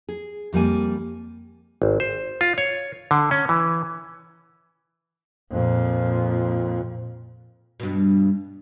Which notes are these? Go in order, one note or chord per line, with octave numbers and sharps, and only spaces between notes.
G#4
F2 G3 A#3 G#5
G#1
C5
F4
C#5
D3
C#4
E3
F2 A#2
G2 B2